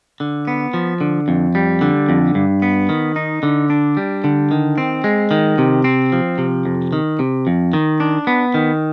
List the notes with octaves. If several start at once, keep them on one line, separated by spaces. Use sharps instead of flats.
D3
B3
F3
D3
F2
G3
D3
F2
G2
B3
D#3
D#4
D3
D4
G3
D3
D#3
C4
G#3
D#3
C3
C4
F3
C3
F2
D#3
C3
F2
D#3
D4
B3
D#3